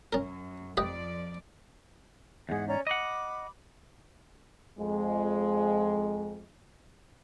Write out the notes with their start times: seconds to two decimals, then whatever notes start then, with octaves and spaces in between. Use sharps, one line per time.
0.13 F#2 C#4 A#4
0.77 F2 F3 G4 B4 D5 D#5
2.49 E2 G#2 G#4 F#5
2.67 C#4 D5 A#5
2.87 D#5 F#5 B5 D6
4.79 F2 G#3